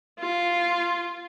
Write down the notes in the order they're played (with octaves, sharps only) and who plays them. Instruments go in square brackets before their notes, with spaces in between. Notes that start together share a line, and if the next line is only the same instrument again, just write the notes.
[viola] F4